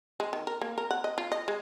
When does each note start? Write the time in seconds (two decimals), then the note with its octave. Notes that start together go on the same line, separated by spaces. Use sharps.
0.20 G#3
0.33 D#3
0.47 A#4
0.61 A#3
0.78 A#4
0.91 F#5
1.04 D#5
1.18 F4
1.32 D#5
1.48 G#3